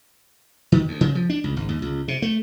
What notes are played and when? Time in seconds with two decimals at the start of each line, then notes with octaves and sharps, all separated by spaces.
0.72 D#3
0.88 D2
1.01 C#3
1.15 F3
1.30 D4
1.44 C#2
1.56 G#1
1.69 D#2
1.82 C#2
2.08 C3
2.22 A3